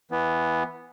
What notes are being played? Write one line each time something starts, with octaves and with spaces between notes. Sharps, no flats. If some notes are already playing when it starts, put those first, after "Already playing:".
E3 B3